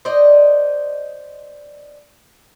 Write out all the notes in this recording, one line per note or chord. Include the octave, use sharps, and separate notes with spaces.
C5 D5 D#5